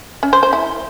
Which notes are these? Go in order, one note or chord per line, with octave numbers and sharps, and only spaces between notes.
C#4
C5
C5
E4